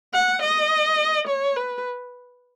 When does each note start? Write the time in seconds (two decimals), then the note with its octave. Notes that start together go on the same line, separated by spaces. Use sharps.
0.14 F#5
0.42 D#5
1.27 C#5
1.56 B4